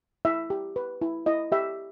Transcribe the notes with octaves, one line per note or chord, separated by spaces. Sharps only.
E4 E5
G4
B4
E4
E4 D#5
G4 E5